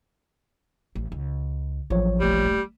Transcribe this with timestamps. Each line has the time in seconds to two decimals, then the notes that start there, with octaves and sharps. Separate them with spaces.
0.95 A1
1.12 C#2
1.90 A1 F3 F#3 C#5
2.20 D#1 G3 A3